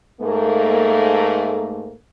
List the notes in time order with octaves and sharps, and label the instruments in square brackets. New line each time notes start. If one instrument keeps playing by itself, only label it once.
[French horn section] G#2 A3 A#3